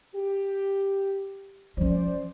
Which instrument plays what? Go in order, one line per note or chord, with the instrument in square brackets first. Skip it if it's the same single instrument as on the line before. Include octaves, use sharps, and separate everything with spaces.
[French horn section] G4
[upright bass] F3 C#4 [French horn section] C5 D5